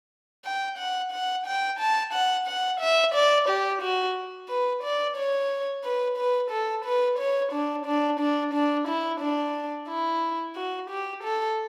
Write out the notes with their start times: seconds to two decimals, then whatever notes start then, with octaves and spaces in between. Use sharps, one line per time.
0.45 G5
0.78 F#5
1.12 F#5
1.46 G5
1.79 A5
2.14 F#5
2.47 F#5
2.80 E5
3.15 D5
3.49 G4
3.82 F#4
4.49 B4
4.83 D5
5.17 C#5
5.84 B4
6.17 B4
6.51 A4
6.85 B4
7.19 C#5
7.52 D4
7.86 D4
8.20 D4
8.54 D4
8.88 E4
9.21 D4
9.88 E4
10.55 F#4
10.90 G4
11.24 A4